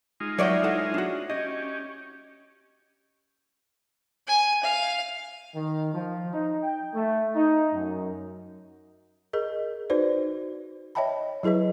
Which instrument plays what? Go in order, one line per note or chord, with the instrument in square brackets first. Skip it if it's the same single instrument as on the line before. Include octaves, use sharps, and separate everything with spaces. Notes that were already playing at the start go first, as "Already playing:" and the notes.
[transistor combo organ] G#3 D#4 F4
[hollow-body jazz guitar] F#3 F#5 G5 [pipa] C#5 D5 E5
[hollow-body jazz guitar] E4 A4 F#5
D4 F#4
[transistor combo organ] C#4 G4 [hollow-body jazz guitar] D#5
[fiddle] G#5
F5
[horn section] D#3
F3
D#4
G5
A3
D#4
F#2
[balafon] G#4 A#4 D#5
D#4 F#4 B4 C5 D5
C#5 D#5 E5 G5 A5 B5
F#3 E4 G#4 B4 D#5